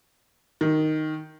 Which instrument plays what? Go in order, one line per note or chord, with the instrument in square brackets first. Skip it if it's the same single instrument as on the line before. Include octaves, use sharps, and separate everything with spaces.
[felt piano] D#3